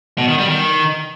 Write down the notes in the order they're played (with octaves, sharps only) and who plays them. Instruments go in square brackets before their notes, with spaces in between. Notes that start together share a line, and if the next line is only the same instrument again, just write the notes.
[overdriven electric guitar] B2
D#3
G3
D#3